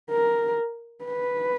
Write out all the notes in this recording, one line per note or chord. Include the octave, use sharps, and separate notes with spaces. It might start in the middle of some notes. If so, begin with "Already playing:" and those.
A#4
B4